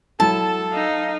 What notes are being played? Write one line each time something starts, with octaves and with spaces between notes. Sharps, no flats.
F#3 E4 A4 A5
D#4 F5